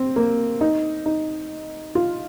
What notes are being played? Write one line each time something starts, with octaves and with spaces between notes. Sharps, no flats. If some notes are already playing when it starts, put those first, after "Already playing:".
Already playing: C4
A#3
D#4
D#4
F4